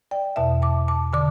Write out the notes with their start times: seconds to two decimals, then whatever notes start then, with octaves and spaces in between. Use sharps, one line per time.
0.11 D5 G5
0.36 E2 B2 E5 A5
0.62 A5 D6
0.88 A5 D6
1.13 D3 A5 D6